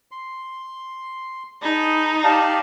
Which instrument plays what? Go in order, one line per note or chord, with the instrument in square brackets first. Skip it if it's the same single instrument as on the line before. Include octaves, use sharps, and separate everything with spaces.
[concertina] C6
[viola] D#4 [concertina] G#4 A5 B5
[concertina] G4 D5 F5 [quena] A5